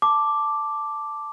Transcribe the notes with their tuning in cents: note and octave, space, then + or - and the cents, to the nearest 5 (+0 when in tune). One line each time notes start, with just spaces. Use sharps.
A5 +0 D6 +0